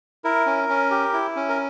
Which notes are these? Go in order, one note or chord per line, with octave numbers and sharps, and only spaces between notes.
E4 A#4
C#4
C#4
G4
E4
C#4
A#4